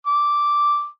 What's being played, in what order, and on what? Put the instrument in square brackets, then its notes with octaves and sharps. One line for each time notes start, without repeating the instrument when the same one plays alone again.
[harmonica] D6